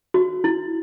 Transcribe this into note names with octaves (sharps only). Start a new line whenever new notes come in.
F#4
E4